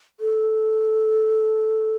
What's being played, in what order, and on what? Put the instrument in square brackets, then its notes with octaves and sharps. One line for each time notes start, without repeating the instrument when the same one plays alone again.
[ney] A4